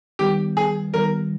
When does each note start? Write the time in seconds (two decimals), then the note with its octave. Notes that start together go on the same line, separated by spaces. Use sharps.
0.19 D#3 G3 B3 G4
0.57 G#4
0.93 D#3 G3 B3 A#4